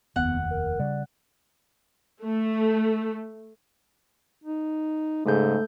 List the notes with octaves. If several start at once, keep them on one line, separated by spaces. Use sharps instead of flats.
F1 D#2 B3 F#5
A#4
C#3 G3 D5
A3
D#4
G#2 C#3 A3 A4 G6